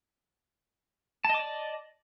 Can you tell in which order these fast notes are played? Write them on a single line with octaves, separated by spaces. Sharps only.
A5 D#5 D6 D5